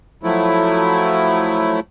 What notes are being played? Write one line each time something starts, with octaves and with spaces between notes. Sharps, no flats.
F3 F#3 A3 E4